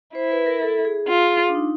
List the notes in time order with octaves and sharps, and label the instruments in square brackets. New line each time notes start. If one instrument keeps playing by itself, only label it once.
[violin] E4 [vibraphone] C5
[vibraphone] B4
A#4
A4
G#4
[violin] F4
[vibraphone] D4
D#4